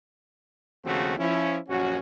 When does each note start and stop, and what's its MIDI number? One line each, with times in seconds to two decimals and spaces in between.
0.85 1.14 39
0.85 1.14 49
0.85 1.14 53
0.85 1.14 57
0.85 1.14 60
0.85 1.14 66
1.18 1.58 53
1.18 1.58 61
1.18 1.58 64
1.68 1.98 34
1.68 1.98 42
1.68 1.98 61
1.68 1.98 66